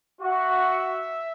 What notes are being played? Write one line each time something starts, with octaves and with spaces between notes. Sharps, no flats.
F#4 E5